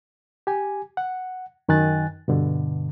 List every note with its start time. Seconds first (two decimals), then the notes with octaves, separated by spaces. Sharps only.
0.47 G4 G#5
0.97 F#5
1.69 F#2 D#3 G#5 F#6 A6
2.28 G2 B2 D3